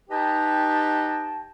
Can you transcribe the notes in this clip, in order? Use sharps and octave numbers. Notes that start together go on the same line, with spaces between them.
D#4 G4 B4 D#5 G5 A5